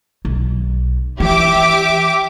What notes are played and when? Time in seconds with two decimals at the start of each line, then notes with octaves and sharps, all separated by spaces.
0.25 B1
1.20 E3 G4 E5 D6